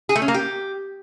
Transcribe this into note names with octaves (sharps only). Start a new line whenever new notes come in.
G#4
A3
C#4
A#3
G4